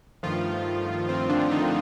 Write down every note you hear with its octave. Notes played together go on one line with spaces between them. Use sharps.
G2 D#3 F3 A3 F4
C4
D3 D4
D#3 D#4